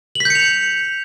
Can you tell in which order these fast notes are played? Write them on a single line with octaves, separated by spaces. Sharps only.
F#7 B6 G6 C#7 F7